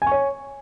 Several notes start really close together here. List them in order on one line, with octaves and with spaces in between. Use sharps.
G#5 C#6 C#5